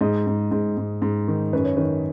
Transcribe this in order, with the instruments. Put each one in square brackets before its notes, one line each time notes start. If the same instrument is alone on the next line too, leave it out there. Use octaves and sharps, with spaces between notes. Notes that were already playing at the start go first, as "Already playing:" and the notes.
[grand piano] G#2 D#5
G#2
G#2
G#2
G#2
D#3
F#2 B4
C#5
D#3 B4